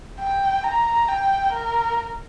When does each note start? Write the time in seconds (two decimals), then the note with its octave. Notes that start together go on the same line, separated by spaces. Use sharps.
0.20 G5
0.64 A#5
1.09 G5
1.53 A#4